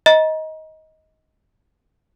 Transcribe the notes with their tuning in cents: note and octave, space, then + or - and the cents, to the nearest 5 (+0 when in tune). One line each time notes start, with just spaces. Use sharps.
D#5 +20 A#5 +35